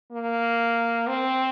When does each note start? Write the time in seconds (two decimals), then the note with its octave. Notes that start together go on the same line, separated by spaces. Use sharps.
0.12 A#3
1.08 C4